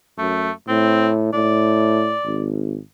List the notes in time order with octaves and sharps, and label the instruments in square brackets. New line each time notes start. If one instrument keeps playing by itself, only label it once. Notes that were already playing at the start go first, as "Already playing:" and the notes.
[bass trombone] F#2 [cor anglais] A3
[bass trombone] A2 [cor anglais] C4
[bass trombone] A2 [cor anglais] D5
[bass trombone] G#1